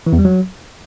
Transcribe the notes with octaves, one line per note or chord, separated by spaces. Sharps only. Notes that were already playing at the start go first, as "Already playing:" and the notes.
E3
E2
G3
F#3